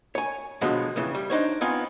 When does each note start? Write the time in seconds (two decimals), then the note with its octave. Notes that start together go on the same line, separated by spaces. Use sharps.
0.15 C#5 G#5
0.61 B2 D3 F3 F#3 G#3 B3
0.96 F2 C#3 E3
1.15 G3
1.30 D4 D#4 C5 C#5
1.61 B3 C4 D#4 F4 G#5